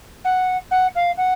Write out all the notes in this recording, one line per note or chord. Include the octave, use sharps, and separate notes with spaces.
F#5
F#5
F5
F#5